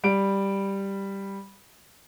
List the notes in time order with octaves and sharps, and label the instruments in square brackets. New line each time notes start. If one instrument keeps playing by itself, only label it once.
[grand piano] G3 D7